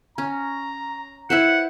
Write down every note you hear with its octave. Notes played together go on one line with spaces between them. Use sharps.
C#4 A#5
E4 B4 C5 F#5